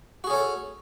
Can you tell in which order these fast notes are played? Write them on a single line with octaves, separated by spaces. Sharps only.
F#4 G#4 C#4 A4